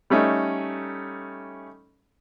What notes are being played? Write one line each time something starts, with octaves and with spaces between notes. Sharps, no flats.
G3 A3 C#4 D#4